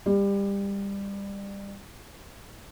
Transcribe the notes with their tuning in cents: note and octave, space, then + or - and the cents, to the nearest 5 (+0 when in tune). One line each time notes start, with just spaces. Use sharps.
G3 +25